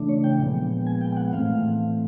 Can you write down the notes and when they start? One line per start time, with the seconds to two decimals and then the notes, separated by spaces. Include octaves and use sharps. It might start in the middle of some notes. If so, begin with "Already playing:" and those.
Already playing: C#3 E3 A3 D4
0.09 C#5
0.24 G5
0.40 A#2 F3 G#3 B3
0.87 G#5
1.01 G5
1.13 G5
1.17 F#5
1.32 A2 E3 A3 C4 F5